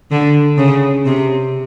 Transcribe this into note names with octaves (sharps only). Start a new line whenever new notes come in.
D3
C#3
C3